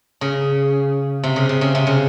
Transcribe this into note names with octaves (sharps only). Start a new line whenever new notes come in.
C#3
C3
C#3
C3
C#3
C3
C#3